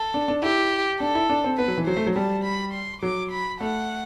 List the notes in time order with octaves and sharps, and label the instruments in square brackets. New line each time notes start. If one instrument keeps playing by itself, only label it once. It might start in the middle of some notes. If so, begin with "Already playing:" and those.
Already playing: [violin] A4
[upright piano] D4
D4
[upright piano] E4 [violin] G4
[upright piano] D4 [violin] A4
[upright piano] E4
D4
C4
[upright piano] B3 [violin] B4
[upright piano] F#3
E3
[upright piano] F#3 [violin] C5
[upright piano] A3
F#3
[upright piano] G3 [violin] A5
[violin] B5
C6
[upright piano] F#3 [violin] D6
[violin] B5
[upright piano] A3 [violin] F#5